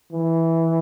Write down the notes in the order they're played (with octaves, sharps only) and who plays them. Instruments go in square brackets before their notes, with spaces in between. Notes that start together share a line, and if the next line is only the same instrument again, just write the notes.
[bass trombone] E3